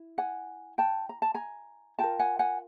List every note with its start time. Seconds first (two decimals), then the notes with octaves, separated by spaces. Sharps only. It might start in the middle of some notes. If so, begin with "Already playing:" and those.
Already playing: E4
0.18 F#5 G#5
0.78 G5 A5
1.09 A#5
1.22 A5
1.34 G#5 A#5
1.99 F4 A#4 G5 A5
2.19 F#5 G#5
2.39 F#5 G#5